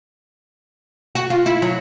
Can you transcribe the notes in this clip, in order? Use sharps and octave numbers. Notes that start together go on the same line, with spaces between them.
F#4
F4
E4
F#3